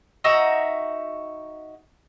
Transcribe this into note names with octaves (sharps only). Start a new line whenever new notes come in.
D#4 F#4 E5 A#5